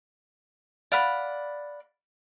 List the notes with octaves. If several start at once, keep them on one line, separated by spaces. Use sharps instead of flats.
D5 F5 F#5 B5